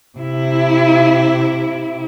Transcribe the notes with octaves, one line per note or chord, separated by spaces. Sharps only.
C3 E4